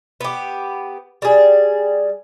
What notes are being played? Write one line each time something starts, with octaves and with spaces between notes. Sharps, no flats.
B3 G4
G3 G#4